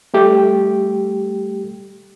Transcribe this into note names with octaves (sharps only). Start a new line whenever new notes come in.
G3 A3 G4